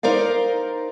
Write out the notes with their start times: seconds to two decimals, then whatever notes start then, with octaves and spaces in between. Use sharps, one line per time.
0.03 D#4 A#4 C5 D5 F5